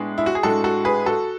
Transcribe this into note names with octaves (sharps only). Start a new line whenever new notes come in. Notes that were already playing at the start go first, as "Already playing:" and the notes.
Already playing: A2 G#3 B3 D4 G#4
E4
F#4
G#4
A2 G#3 D4 F#4 A4
F#4 A4
G#4 B4
F#4 A4